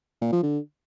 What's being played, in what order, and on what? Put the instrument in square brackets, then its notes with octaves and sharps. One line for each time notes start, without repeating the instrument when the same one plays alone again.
[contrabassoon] A#2
F3
D3